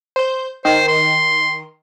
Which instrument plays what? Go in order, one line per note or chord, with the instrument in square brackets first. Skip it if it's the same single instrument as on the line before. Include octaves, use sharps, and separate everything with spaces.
[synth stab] C5 G6
[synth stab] D#3 [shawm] C5
[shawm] C6